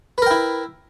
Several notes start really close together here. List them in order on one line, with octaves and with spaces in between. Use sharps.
B4 A#4 G5 E4